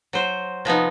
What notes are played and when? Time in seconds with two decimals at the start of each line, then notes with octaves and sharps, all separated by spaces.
0.13 F#3 C5
0.65 C3 F3 B3 D#4